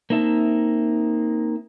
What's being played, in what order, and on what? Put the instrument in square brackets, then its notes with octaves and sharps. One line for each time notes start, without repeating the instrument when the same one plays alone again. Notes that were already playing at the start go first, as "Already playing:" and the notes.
[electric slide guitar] A#3 C4 D#4 E5 A5